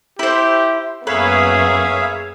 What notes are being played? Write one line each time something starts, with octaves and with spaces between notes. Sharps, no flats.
E4 G4 C5
F#2 A#3 B3 G#4 B4 C#5 E5 F5